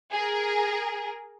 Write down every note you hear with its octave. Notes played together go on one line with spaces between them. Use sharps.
G#4 A#4